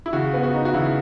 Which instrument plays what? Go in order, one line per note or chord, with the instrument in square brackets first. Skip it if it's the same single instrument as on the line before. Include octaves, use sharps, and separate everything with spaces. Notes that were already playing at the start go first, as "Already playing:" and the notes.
[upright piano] E4
[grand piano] C#3 [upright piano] F#4
[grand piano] B3
[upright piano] F#4
[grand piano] D#4
[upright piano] F#4
[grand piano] C#3 [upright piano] E4